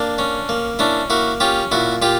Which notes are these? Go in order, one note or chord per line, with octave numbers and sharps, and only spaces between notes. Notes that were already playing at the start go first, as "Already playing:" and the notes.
Already playing: A#3 D4
C#4
A#3
C#4 D4 E4
A#3 E4 F#4
C#4 F4 G4
A#2 E4 F#4
A#2 F4 G4